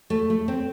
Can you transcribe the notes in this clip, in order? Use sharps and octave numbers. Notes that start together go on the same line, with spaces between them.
A3
A3
C4